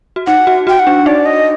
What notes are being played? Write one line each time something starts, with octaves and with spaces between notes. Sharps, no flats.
F#4
D#4 F#5
F#4
F#4 G5
F#5
D4
D#4 D5
D#5